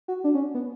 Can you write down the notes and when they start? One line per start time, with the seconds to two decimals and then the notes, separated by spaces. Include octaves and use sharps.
0.08 F#4
0.24 D4
0.34 C#4
0.54 B3